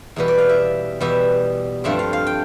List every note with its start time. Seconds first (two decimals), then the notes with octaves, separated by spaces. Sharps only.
0.16 E2 B2 G3 B3 B4
0.28 D5
0.38 F5
0.49 E5
1.00 E2 B2 G3 B3 E5
1.84 G2 F3 A3 C4 E5
1.99 F5
2.13 F5
2.27 G5